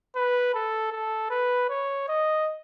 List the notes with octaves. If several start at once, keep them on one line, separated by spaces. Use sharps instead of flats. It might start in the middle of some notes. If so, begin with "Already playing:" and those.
B4
A4
A4
B4
C#5
D#5